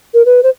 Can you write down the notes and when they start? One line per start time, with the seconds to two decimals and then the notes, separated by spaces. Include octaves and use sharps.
0.14 A#4
0.25 B4
0.43 C5